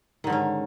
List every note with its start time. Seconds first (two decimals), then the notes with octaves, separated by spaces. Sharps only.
0.24 D#3
0.27 D3
0.30 G#2
0.32 C#4